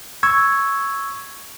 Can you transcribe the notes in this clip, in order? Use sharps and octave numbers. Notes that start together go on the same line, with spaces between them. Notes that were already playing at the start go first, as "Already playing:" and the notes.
C#6 E6 G#6